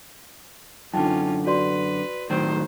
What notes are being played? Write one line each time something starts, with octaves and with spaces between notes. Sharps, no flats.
F#2 D3 C#4 D#4 F4 G5 A5
F#4 B4 D5 C6
A2 D#3 F#3 C5